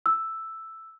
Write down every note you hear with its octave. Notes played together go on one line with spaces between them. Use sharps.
E6